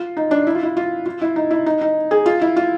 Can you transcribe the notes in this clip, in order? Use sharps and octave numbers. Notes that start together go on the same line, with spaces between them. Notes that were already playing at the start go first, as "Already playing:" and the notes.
Already playing: F4
D#4
D4
E4
F4
E4
F4
F4
E4
D#4
E4
D#4
D#4
G#4
F4
E4
F4